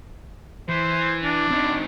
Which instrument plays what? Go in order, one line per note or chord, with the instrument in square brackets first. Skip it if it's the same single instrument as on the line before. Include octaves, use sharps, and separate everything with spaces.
[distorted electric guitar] E3 [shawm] C5
[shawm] D4
[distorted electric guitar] C4 D#4